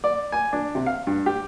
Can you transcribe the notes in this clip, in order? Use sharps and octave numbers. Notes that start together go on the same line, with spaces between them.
D5
G#5
D4
C3
F5
G2
G4